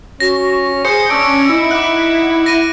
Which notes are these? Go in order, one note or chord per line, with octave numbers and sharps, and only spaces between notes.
C#4 F#4 A#6
G#4 C5 D#6 C#7
C#4 D4 E6 D7
D#4 E4
F#5 D6 F#6
A#6 D#7